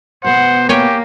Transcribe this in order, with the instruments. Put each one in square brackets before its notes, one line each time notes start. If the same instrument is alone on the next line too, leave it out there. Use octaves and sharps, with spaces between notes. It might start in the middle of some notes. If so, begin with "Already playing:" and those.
[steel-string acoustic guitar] B2 B3 [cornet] C5 [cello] F#5
[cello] A#3 [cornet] G4 [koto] C#5 G5 G#5